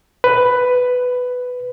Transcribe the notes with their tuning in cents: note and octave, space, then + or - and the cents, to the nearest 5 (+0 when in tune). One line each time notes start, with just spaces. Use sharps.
B4 +10